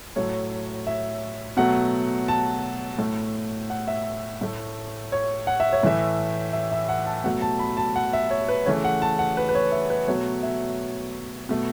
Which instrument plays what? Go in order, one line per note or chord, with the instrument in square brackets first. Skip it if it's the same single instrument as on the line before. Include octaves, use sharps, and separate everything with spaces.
[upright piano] A2 F#3 A3 C#5
E5
B2 F#3 A3 F#5
A5
A2 A3
F#5
E5
A2 A3
C#5
F#5
E5
C#5
A2 E3 A3 E5
E5
E5
F#5
A5
B2 F#3 A3 F#5
A5
B5
A5
F#5
E5
C#5
B4
C#3 E3 A3 C#5
F#5
A5
F#5
B4
B4
C#5
E5
B4
B2 F#3 A3 C#5
E5
B2 A3